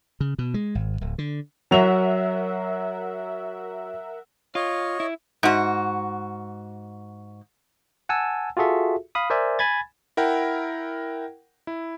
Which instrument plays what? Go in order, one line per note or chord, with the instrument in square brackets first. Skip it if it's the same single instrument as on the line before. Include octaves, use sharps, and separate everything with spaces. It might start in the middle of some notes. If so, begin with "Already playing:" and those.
[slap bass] C#3
B2
G#3
G#1
D1
D3
[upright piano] F#3 F7 [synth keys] A#4 E5 F#5
[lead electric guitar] F4 [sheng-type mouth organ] C#5 D#5
[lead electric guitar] E4
[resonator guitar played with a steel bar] G#2 F#4
[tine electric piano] F#5 G#5 A5 E6
F4 F#4 G#4 A4 E5
F5 B5 D#6
A#4 C5 D5 E5 G#5
G#5 B5 G#6 A6
[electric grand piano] E4 A#4 F#5 G5
E4